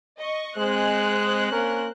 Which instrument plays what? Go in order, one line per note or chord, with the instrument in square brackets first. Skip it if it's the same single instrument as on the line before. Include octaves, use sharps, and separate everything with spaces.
[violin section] D#5 C#6
[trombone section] G#3 [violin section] C4 C5 F#6
[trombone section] A#3 C#4 A#4